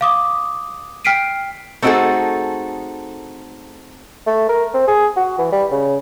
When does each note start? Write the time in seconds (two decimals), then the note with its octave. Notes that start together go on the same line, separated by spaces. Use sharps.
0.01 F5 D6 D#6
1.05 G5 F6 B6 C7 D7 D#7
1.82 A3 C4 D#4 F#4 G#4 A4
4.27 A3
4.49 A#4
4.74 C4
4.88 G#4
5.17 F#4
5.39 E3
5.52 G3
5.71 C#3